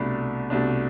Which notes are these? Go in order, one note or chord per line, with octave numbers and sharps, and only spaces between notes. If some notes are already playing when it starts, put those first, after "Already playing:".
Already playing: C2 B2 A3 D4 B5
C2 B2 A3 D4